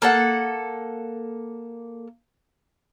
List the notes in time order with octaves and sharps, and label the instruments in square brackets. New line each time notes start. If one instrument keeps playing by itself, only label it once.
[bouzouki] A#3 A4 F#5